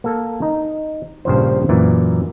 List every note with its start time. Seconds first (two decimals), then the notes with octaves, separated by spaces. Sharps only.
0.04 A#3 A4
0.42 D#4
1.25 A#1 G2 C#3 F3 C5
1.69 F#2 A#2 E3